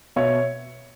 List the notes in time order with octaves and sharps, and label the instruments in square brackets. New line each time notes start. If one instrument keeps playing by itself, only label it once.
[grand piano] B2 C#5 E5